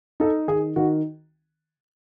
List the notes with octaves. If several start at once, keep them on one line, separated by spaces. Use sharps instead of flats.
D#4 A4
D#3 G#4
D#3 F#4